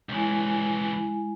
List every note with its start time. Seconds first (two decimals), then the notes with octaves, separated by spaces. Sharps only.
0.09 C#2 E3 G#3 E4 G#5